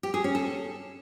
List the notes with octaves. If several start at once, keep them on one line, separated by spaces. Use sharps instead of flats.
G4
G#4
C#4
A4